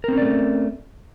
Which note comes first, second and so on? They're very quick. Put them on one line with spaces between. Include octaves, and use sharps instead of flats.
A#4 C4 C#4 D5 A3